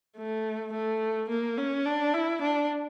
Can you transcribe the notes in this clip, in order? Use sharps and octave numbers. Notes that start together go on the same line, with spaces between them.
A3
A3
A#3
C#4
D4
E4
D4